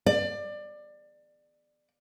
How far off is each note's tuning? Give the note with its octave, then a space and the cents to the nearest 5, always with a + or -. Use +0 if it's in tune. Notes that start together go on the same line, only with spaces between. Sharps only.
D5 +25